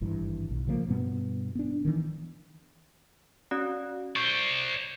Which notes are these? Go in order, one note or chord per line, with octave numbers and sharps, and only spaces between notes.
G#1 G2 E3
B1
C#3 F3 F#3 A#3
G2 B2 G3 B3
B3 D4
D#3 E3
C#4 F#4 D5
C5 D5 C#6